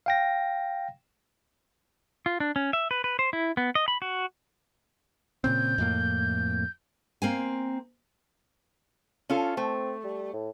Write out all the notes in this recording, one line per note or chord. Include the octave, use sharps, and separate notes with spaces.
F5 G5 A#6
F4
D4
C#4
E5
B4
B4
C5
E4
B3
D#5
B5
F#4
A#2 C#3 C4 G6
F2 A2 A#3
A#3 C4 G#5
C#4 F4 A4
A3 C4
G3
A2